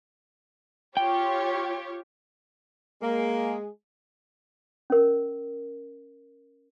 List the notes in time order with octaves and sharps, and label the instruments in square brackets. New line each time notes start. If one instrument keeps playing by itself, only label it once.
[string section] F4 G4 C#5 [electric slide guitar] G5
[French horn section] G#3 G#4 [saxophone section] A#3
[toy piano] C#4 A#4